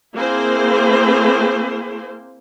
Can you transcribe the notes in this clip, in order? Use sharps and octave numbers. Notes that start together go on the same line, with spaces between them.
A#3 C4 E4 G#4 C5